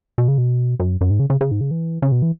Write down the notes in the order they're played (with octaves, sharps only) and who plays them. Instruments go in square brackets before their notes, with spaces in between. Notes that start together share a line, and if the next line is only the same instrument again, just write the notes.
[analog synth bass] B2
C#3
B2
F#2
F#2
G#2
C#3
C#3
C#3
G#2
C#3
E3
C#3
B2
E3